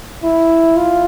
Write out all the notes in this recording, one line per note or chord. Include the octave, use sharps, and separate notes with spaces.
E4
F4